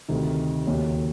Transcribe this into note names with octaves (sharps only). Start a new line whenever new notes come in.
D2 C3 D#3
D#2 C#3 F#3